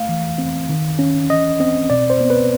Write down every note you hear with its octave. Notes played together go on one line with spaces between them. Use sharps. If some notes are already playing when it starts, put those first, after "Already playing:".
Already playing: A3 F5
E3
C4
D#3
C#4
E3 D#5
C4 D#5
B2 D5
C5
B3
B4